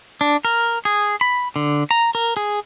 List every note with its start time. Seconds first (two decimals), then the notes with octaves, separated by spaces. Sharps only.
0.21 D4
0.45 A#4
0.85 G#4
1.21 B5
1.56 D3
1.91 A#5
2.15 A#4
2.37 G#4